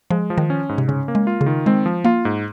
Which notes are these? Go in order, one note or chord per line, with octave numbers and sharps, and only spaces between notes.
F3 G#3
F3
D#3
C#4
G#2
C3
C#3 C#4
A#3
G#3
F4
C#3
D#3
G#3 C4
F3
A#3 F4
G#2